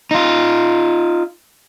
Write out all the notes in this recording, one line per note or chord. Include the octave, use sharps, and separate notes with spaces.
D#4 F4